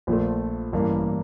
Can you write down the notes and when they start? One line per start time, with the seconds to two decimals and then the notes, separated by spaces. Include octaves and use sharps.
0.07 A#1 A#2 F3 A3
0.73 A1 G2 E3 A#3